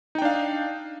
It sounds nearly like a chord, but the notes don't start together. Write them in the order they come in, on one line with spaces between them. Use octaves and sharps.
D#4 G5 D4 F5